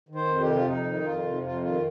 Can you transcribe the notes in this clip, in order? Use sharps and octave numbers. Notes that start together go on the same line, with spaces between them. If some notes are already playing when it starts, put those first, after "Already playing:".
D#3
C5
F2
G4
C3
F4
F2 D#4
D#3
F2 F4
C3
F2 F4
D#3 F4